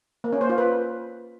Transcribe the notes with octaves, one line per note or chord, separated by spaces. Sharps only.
A#3
C#4
C5
F4
B4